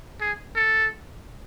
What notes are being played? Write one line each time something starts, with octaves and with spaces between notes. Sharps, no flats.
G#4
A4